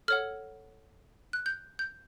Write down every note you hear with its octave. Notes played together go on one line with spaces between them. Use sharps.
A4 C#5 F#5 F6
F#6
G6
G6